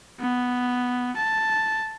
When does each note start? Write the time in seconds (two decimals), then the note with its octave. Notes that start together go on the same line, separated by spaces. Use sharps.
0.20 B3
1.17 A5